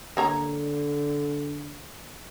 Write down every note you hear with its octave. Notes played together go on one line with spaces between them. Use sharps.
D3 A#3 C#5 A#5